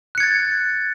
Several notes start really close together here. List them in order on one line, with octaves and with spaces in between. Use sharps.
F#6 C#7 G#6 A6